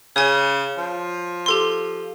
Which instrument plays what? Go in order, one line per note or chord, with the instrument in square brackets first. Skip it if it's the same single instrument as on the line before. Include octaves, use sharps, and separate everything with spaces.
[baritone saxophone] C#3 [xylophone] C#5 G#5
[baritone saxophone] F3
[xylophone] G4 A4 C6